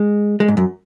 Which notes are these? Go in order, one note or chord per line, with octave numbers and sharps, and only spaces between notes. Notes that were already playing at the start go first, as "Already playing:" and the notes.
Already playing: G#3
G#3
G#2
F#2